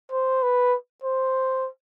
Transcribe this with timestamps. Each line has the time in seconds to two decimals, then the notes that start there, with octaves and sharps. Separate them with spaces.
0.12 C5
0.43 B4
1.04 C5